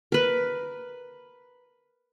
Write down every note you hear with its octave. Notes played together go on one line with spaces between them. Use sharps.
A#4 B4